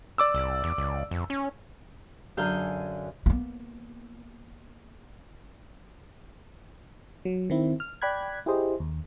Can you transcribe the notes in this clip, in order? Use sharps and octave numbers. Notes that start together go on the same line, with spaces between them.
D5 D6 E6
C2
E2
C#2
F2
C#4
F#2 D3 G#4 F5 G6
A#3 B3
F#3
D#3 C4 E4
F6
D5 G5 B5 F#6 G#6
E4 G4 G#4 C5 D#5
D#2